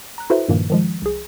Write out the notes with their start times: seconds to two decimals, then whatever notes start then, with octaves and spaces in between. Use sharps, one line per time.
0.18 A#5 F#6
0.30 E4 F#4 A4 B4 C5 E5
0.48 G2 A#2 D#3 F3 A#3
0.70 D#3 F3 G#3
1.02 C2 G#4